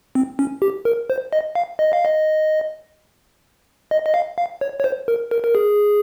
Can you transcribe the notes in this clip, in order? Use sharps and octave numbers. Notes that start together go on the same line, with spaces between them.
C4
C#4
G4
A#4
C5
D#5
F5
D#5
F5
D#5
D#5
D#5
F5
F5
C#5
C#5
C5
A#4
A#4
A#4
G#4